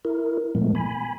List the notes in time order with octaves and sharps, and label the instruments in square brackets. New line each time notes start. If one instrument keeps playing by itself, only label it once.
[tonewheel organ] E4 A#4
A#2 F3 G#3 A3 B3
G#5 B5